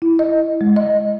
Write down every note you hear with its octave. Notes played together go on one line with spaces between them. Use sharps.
E4
D#5
G#3
D#5